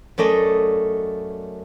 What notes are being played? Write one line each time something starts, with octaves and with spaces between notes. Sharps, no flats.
F#2 A3 D5 D#5